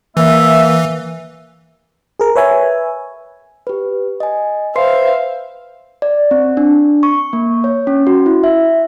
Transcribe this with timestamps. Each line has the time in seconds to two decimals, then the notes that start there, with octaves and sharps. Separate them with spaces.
0.17 E3 A#3 E5
2.20 G#4 A#4
2.36 B4 C#5 E5 G#5
3.67 G4 B4
4.20 D#5 G#5
4.76 B4 C5 E5 F5 C6 C7
6.02 D5
6.31 C4
6.57 D4
7.03 C#6
7.33 A#3
7.64 C#5
7.87 C#4
8.07 F#4
8.26 E4
8.44 E5